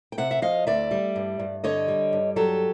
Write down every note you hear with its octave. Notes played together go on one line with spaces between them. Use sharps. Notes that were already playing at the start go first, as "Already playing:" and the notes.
G5
C3 E5 F#5
E5
F3 D#5 F5
D2 D5 E5
G3
G2
G2
D3 C#5 D#5
G3
G2
F#3 G4 A4